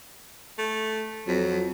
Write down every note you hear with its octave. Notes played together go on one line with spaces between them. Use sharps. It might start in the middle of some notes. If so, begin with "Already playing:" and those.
A3
F2 F#3